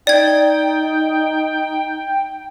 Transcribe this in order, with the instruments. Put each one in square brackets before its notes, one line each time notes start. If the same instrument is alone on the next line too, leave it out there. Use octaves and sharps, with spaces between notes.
[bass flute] D#4 [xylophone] D5 G#6 [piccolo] G5